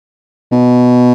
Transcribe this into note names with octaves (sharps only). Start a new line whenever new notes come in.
B2